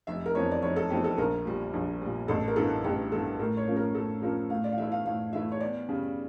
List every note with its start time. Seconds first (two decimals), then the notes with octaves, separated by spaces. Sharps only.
0.07 F1 E5
0.26 A#4
0.35 F2 E3 C#5
0.51 D5
0.62 F1 C#5
0.76 A4
0.90 F2 E3 G4
1.04 A4
1.18 A#1 A#4
1.45 A#2 G3
1.73 A#1
2.01 A#2 G3
2.28 A1 A4
2.48 A#4
2.56 G2 E3 A4
2.84 A1 G4
3.12 G2 E3 A4
3.39 A2 A#4
3.57 C#5
3.67 F3 A#3 C#4
3.76 A#4
3.94 A2 A4
4.22 F3 A#3 C#4 A#4
4.50 A2 F5
4.64 D5
4.72 F5
4.77 E3 A3 E4 E5
4.92 F5
5.05 A2 F5
5.33 E3 A3 E4 E5
5.52 C#5
5.60 E2 D5
5.89 C#3 G3